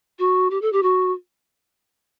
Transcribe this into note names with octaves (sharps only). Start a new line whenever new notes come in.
F#4
G4
A4
G4
F#4